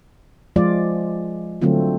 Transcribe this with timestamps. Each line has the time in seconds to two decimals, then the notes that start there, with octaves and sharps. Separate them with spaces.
0.56 F3 G#3 F4 D5
1.61 D3 F#3 A3 C4 F4